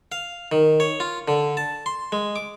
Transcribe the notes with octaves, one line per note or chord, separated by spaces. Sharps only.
F5
D#3
C#5
F4
D3
A5
C6
G#3
D6